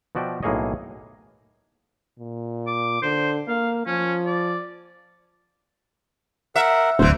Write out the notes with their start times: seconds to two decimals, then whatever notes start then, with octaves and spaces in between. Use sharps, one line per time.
0.15 B2 F3 F#4 D5 E5 G5
0.43 B1 A2 A#3 G#4 C#5 D#5
2.19 A#2
2.67 D6
3.02 D3 C5
3.48 A#3 F5
3.86 F3 C#4
4.26 D5
6.56 A#4 E5 F#5
6.99 D1 A#2 E3 C5